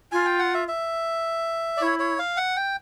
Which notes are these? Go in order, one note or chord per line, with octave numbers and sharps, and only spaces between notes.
F4 G#5
G5
F#5
E5
E5
D5
E4 C#5
C#5
F5
F#5
G5